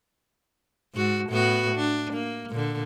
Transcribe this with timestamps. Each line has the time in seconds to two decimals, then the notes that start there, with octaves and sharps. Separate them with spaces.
0.94 G#2 F#4
1.30 A2 B3 F#4
1.76 D4
2.13 A#3
2.50 A#2 D3